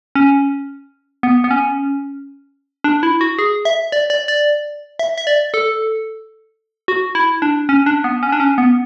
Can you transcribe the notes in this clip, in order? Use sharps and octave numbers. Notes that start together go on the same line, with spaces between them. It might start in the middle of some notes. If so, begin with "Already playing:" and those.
C#4
B3
B3
C#4
D4
E4
F#4
G#4
E5
D5
D5
D5
E5
E5
D5
A4
F#4
E4
D4
C#4
D4
B3
C#4
D4
C#4
B3